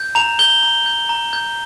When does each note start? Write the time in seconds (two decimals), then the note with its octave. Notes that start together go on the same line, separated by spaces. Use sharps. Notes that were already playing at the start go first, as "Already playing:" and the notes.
Already playing: G6
0.15 A#5 F7
0.39 G6 G7
0.63 A#5
0.86 G6
1.09 A#5
1.33 G6